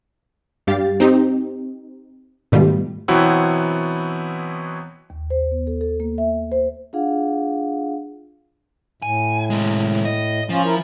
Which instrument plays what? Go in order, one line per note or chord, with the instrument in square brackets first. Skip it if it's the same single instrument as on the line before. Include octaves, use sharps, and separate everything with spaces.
[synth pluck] G2 G3 G4 F5 A6
C4 D#4 G4
G#2 B2 D#3 G3 A3 F4
[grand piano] B2 E3 F#3 B3 C4 E4
[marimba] D#2
C5
B3
A4
A4
A#3
E5
C5
[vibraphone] D4 F4 G#4 F5 F#5
[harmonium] A2 [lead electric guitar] G#5
[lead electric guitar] C3 G#3
D#5
[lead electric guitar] F3 [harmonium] C#4 F4
[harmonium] E4 A#4